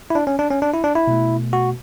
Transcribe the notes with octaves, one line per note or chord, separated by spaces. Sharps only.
E4
D4
C#4
D4
C#4
D4
E4
D4
E4
B2 A3
F#4